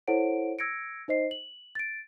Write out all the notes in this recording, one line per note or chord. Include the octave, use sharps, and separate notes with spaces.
E4 A4 C5 C#5 F#5 D7
E6 G#6 A#6 C#7 D7
D#4 C5 D#5 C7
F#7
A6 D7